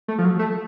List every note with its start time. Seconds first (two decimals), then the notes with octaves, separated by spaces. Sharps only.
0.08 A3
0.18 F3
0.24 F#3
0.39 A3